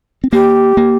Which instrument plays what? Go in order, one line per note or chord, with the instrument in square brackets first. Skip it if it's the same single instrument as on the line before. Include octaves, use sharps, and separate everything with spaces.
[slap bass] C4
[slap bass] A#3 [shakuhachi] G4
[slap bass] A#3